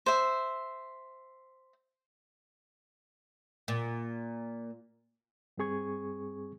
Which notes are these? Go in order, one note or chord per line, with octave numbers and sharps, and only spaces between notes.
C5 E5
A#2
G2 G3 C4 G#4 C#6 G#6